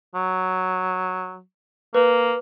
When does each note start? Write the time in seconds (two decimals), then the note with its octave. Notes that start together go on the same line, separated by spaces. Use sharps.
0.15 F#3
1.95 A#3 B4